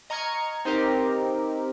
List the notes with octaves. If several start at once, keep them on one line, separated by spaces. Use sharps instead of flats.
D#5 A#5 C#6 F6 G#6 C#7
C4 D#4 G4 A#4